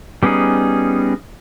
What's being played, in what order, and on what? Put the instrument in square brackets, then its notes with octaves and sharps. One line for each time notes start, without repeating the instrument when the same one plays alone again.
[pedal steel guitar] G3 B3 C#4 D#4 G#4